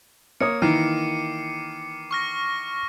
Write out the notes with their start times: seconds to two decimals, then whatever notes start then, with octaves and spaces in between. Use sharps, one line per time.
0.40 A#3 C#5 D#6 C#7
0.62 D#3 E3 A#3 D6 C7 D#7
2.11 C#6 F6 A#6